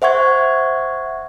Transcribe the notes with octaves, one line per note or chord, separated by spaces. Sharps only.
C5 E5 F#5 C#6 G#6